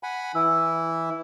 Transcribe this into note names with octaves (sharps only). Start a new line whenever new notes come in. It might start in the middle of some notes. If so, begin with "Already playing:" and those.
F#5 G#5 B5
E3 E4 E6